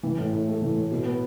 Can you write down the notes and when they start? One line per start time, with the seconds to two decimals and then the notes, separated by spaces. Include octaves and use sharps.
0.03 E3
0.18 A2
0.33 A2
0.48 A3
0.62 E3
0.76 A2
0.91 B2
1.06 B3